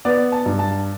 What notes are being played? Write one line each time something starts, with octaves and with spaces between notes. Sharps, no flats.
B3 D5
A5
G2
A5